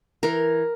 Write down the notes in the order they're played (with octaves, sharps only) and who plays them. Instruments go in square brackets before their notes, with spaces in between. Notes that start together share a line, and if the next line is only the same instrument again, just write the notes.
[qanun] E3 A#4